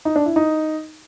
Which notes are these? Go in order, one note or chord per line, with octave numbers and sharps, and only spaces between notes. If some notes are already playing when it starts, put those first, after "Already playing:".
D#4
D4
E4
D#4